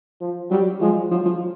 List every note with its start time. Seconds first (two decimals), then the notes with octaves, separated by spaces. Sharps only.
0.21 F3
0.51 F#3 G3
0.81 F3 G#3
1.11 F3 F#3
1.26 F3